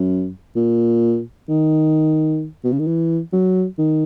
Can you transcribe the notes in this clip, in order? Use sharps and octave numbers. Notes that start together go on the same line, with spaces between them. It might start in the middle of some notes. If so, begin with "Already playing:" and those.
Already playing: F#2
A#2
D#3
B2
C#3
D#3
E3
F#3
D#3